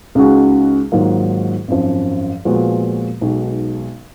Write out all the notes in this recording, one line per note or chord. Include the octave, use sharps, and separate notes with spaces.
C#2 C#3 G#3 D#4 F#4
G#2 D#3 F#3 A#3 F4
G#1 F#2 F3
A#2 F3 G#3 B3 F#4
B1 B2 G#3 D#4 F#4